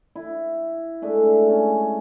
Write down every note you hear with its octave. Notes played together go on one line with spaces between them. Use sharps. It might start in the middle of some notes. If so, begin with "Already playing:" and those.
E4
G#3 A3 D4 E5
C#4